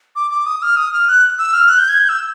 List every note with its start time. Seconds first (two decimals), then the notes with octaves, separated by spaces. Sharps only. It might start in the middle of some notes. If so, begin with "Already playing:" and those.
0.16 D6
0.31 D6
0.46 D#6
0.62 F6
0.77 D#6
0.93 F6
1.08 F#6
1.39 E6
1.54 F6
1.69 F#6
1.78 G6
1.89 G#6
1.99 G6
2.09 E6